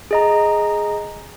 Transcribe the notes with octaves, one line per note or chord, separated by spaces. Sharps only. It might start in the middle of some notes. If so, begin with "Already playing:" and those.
G#4 D#5 A#5